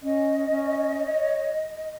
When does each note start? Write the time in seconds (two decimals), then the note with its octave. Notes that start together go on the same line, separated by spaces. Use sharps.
0.02 C#4 D#5
0.49 C#4
0.97 C#5